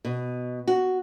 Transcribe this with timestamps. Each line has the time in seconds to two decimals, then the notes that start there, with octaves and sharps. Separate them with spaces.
0.05 B2
0.68 F#4